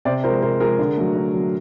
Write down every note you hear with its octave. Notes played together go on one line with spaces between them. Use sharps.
C3 C5 D5
F3 G#3 A#4 C5
C3 A#4 C5
F3 G#3 G#4 A#4
D3
F#3 A3
D3
F#3
A3